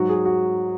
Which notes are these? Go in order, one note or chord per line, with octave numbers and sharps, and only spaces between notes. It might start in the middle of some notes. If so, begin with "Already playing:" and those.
Already playing: G#2 F#3 F#4
G#4
F#4